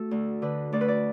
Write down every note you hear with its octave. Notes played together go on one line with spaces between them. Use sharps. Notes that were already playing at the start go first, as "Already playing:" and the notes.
Already playing: A3 F#4 A4
D2
D3 B4
D2 D5
B4
D5